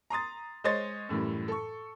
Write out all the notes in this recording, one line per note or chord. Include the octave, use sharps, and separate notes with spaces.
A#5 C6 D#6 A6
G#3 C5 C#5 D#5 C6 A6
F#2 A2 E3 G3
A4 C#6